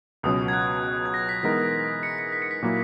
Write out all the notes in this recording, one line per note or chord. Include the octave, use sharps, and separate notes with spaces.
C#2 B2 F#3 C#4 D#6
G#6
F#6
G#6
A#6
B6
E3 G#3 B3 D#4 A#4 B6
C#7
C#7
B6
C#7
B6
A#2 F#3 A#3 E4